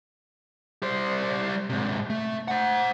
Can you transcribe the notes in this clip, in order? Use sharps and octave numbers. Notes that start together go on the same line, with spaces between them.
G3 C5
G#2 C3
A3
C5 F#5